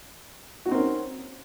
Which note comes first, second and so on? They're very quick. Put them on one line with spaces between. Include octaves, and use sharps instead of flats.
F#4 D#4 C4 A#4 C#4